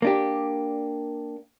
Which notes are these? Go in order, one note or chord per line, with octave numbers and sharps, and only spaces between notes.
A#3 D4 G4